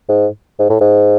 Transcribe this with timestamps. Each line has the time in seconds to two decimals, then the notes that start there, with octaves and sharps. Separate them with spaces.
0.09 G#2
0.59 G#2
0.69 A2
0.81 G#2